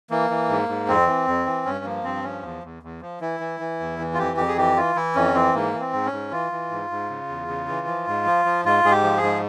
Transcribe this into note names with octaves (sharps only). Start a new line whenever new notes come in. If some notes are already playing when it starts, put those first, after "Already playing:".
E3 A#3
E3
G#2
G#2
F2 C4
E3
F2
E3
G2 C#4
F3 A#3
G2 C4
F3 C#4
E2
E2
E2
F3
E3 E4
E3
E3
E2
E3
F4
F2 G4
F2 G4
G#4
E3 G4
E3 F4
E3 E4
F2 C#4
E3 C4
G#2 A#3
E3
C4
G#2
C#4
G#2
E3 F4
E3
G#2
G#2
C#3
E2
C#3
E3
F3
G#2
F3
F3
G#2 F4
G#2 G#4
G4
F3
G#4
G#2